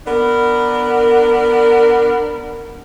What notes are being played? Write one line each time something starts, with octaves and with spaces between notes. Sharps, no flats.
B3 D4 A#4